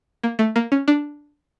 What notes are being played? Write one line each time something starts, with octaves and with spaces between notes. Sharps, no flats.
A#3
A3
A#3
C#4
D4